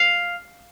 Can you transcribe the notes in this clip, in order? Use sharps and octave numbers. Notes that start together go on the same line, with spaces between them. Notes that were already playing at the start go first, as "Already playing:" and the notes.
Already playing: F5